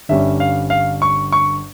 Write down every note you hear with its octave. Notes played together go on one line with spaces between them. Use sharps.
G1 G2 G3 C#4 E5
F5
F5
C#6
C#6